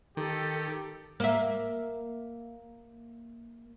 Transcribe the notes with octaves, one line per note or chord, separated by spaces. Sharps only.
D#3 G4 A4
A#3 E5